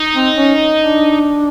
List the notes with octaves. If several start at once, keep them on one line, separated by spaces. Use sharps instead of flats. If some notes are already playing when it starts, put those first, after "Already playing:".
Already playing: D#4
C4
C#4
D4